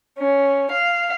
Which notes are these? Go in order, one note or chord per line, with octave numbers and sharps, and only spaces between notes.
C#4
F5